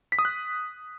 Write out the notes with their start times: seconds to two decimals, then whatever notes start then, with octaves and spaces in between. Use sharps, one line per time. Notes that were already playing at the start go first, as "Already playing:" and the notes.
0.12 B6
0.19 D#6
0.25 F#6